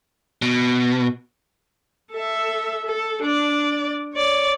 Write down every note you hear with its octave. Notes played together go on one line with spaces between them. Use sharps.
B2
A4 E5
A4
D4 D5
C#5 D5